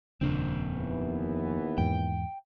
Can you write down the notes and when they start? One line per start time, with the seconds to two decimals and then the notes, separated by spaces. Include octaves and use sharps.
0.21 D#1 F2 C#3 A#3 C4 D4
0.76 D#2 E3 B3
1.78 E2 G#2 G5